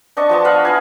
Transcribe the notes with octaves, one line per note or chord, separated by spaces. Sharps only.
D4 D#5 A5 C#6
F3 B3 A5
D#5 F5 F#5 B5
E4 G#5